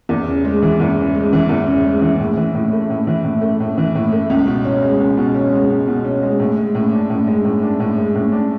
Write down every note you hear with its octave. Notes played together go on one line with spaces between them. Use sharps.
E2
C#3
G#3
E3
E2
C#3
G#3
E3
E2
C#3
G#3
E3
A2
E3
A2
A3
A2
E3
A2
A3
A2
E3
A2
A3
C#2
B2
C#4
G#3
C#2
B2
C#4
G#3
C#2
B2
C#4
G#3
A2
G#3
A2
D4
A2
G#3
A2
D4
A2
G#3
A2
D4